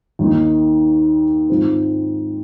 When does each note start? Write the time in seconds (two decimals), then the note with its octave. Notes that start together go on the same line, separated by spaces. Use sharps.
0.19 D#2 D#3 A#3 D#4
1.49 G#2 D#3 G#3 C4 F4